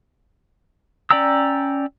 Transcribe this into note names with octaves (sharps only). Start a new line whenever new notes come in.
C#4 D5 G5 A#5 E6